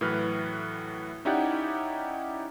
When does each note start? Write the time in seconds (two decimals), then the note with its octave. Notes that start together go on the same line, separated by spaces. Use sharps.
0.01 A2 E3 F#3 B4 F6
1.25 C#4 D#4 E4 G4 D5 F#5